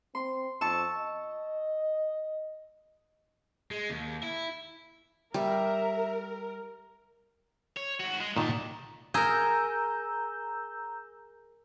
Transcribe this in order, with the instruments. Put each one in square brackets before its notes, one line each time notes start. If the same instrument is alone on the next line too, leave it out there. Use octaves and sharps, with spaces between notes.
[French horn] C4 [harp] C6
[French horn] F2 [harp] A5 C#6 E6
[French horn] D#5
[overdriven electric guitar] G#3
D#2
E4
[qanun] G3 [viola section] A#4 [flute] E5
[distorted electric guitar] C#5
G#2 F#4
G#3
[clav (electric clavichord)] A#2 D#3 [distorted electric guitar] F#4 A5
[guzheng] G#4 A#4 [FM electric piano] A#5 E6 G6